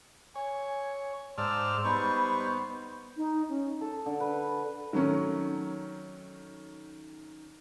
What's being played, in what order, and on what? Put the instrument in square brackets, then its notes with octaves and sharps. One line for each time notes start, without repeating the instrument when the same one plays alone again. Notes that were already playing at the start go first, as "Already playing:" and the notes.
[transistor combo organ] C#5 [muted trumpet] G#5
[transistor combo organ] G#2 D5 F6 [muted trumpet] C5 [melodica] A5 E6
[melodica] G3 D#4 C#6 [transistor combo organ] B3 [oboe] C5 [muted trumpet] B5
[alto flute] D#4
C#4
[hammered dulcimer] A4
D3
B4
[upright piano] D#3 F#3 A3 C#4